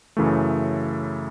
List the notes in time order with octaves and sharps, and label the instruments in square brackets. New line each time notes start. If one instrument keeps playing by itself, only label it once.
[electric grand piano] F#2 C#3 E3 A3